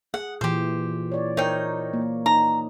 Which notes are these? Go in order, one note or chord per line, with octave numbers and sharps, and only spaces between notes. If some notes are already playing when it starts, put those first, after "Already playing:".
G#4 F#5
A#2 E3 G4 C5
C#5 D5
D#4 A#4 C5 C#5 G5
A#3
D#4 A#5